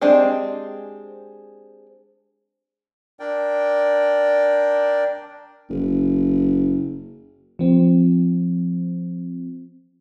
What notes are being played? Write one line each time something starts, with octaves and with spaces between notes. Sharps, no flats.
G#3 C4 D4 G4
D4 A#4 D5 G5
F#1
F3 C4